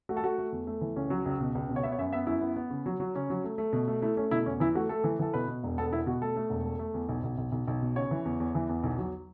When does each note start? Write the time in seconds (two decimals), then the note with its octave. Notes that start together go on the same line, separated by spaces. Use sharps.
0.09 A3 F#4
0.17 A4
0.23 A3 F#4
0.38 A3
0.52 E2
0.67 A3
0.81 E3
0.96 C#2 C#4
1.10 F#3
1.26 C#2
1.40 B2
1.55 C#2
1.69 B2
1.76 C#5
1.83 B3 E5
1.92 C#5
1.98 F#2 E5
2.13 B3 E5
2.27 F#2 E4
2.42 B3
2.56 B3
2.71 C#3
2.86 F#3
3.00 F#3
3.15 C#3 C#4
3.30 F#3
3.44 A3
3.58 A3
3.73 B2
3.88 A3
4.02 A3 E4
4.17 A3 C#4
4.31 B2 E4
4.46 E2 C#4
4.60 E3 E4
4.75 A3 F#4
4.89 A3 A4
5.04 E3
5.19 E3 A4
5.34 B2 B4
5.48 B2
5.63 E1
5.78 B3 A4
5.91 B3 E4
6.06 B2 F#4
6.22 A3 A4
6.36 A3
6.50 E1
6.66 A3
6.79 A3
6.94 E2
7.08 B1
7.23 B1
7.38 B1
7.52 B1
7.67 B1
7.81 B2
7.96 C#3 C#5
8.11 E3
8.25 E2
8.40 E2
8.55 E3
8.69 E2
8.83 B1
8.98 F#3